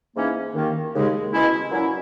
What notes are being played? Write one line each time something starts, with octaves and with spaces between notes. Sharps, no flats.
G#2 E3 A#3 C#4
D#2 D#3 A#3
D#2 C#3 G#3
B2 G#3 C#4 E4
A#2 F#3 C#4 E4